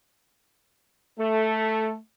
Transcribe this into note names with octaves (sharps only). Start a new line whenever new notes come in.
A3 A4